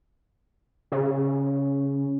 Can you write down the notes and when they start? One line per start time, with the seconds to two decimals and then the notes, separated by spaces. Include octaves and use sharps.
0.92 C#3